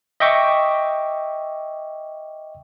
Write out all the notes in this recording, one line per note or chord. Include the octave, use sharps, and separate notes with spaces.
D#5 E5 G5 C#6 D6